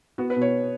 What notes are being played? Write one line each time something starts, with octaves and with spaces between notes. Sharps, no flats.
B3 F#4
B4
B2
C#5